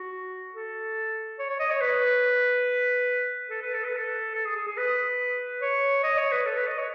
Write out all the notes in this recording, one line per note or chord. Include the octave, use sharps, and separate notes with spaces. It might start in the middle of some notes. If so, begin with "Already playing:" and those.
Already playing: F#4
A4
C#5
C#5
D#5
C#5
B4
A4
B4
A4
B4
A4
A4
G#4
G#4
G#4
B4
C#5
D#5
C#5
B4
A4
B4
D#5
C#5